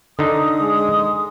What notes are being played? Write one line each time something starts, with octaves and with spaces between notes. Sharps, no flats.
D3 D#4 D#6
G#3